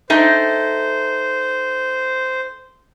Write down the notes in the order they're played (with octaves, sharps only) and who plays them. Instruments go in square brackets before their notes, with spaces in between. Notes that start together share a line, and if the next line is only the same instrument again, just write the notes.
[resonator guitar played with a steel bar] A3 D#4 G5 [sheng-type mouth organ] C5